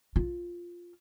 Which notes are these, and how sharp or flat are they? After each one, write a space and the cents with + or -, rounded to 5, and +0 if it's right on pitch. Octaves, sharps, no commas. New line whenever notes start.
F4 +0